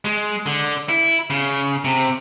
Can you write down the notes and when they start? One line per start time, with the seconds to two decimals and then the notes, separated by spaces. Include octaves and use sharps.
0.05 G#3
0.46 D3
0.89 E4
1.30 C#3
1.85 C3